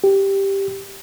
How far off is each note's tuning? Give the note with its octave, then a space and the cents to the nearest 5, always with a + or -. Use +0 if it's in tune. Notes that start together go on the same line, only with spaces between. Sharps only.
G4 +0